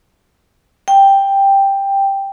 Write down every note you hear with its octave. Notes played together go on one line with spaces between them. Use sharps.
G5